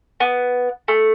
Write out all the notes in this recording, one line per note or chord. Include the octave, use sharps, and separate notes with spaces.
B3
A3